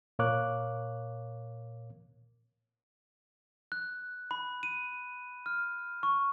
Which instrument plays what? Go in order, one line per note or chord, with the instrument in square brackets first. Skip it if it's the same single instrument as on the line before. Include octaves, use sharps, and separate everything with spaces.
[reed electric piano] A#2 A#4 C#5 F5 D6 F#6
[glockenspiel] F#6
B5
D#7
F6
C#6